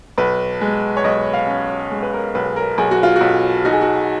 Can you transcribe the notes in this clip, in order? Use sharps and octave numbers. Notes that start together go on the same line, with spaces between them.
B1 B4
G#3
C#5
B1 D#5
F5
C#4
G#3
B4
A#4
B1 B4
A#4
B1 G#4
F#4
F4
F#4
B1
D#4 F#4
G#4
F#4